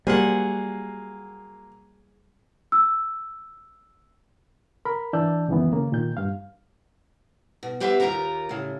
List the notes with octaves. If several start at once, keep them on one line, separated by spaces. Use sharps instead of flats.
F#3 G3 A#3 G#4 C5 F#5
E6
A#4 B5
E3 D4 D5 A5 E6 G6
C#2 F#2 D#3 E3 G#3 B3
C#3 A#3
A#2 D#3 G6
G2 F5
B2
B3 G4 B4 C5 E5 F5
D#2 G#2 F4 G4 A#4 A#5
A2 C#3